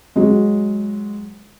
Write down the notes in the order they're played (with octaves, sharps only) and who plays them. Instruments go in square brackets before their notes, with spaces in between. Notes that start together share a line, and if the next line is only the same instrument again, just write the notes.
[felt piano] F#3 G#3